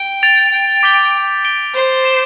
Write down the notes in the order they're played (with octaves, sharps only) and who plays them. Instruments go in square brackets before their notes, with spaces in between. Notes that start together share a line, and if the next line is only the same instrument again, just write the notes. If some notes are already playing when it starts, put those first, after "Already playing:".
Already playing: [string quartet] G5
[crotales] A6 D7 F7
[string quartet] G5
[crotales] D6 G6 B6 D7 G7
A6 D7 G7
[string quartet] C5
[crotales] A6 E7 G7